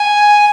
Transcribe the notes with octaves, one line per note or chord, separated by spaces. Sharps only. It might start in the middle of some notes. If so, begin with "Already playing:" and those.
Already playing: G#5